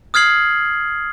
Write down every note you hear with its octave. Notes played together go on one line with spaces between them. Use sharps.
D#6 F6 G#6 C7 F#7